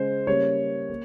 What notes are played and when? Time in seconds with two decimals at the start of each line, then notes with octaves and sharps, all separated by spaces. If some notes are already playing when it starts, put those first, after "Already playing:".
Already playing: C#3 G#3 C5
0.27 C#3 G3 A#3 C#5
0.90 A#3